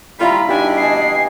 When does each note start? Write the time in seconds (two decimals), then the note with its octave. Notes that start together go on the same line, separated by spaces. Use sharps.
0.20 G3 E4 F4 F5 A#5 B5 C#6
0.49 G2 B2 D4 D#4 G4 G#5
0.77 D#5 G#5 C7